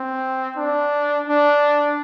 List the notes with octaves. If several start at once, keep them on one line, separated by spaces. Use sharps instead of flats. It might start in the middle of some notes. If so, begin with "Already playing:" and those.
Already playing: C4
D4
D4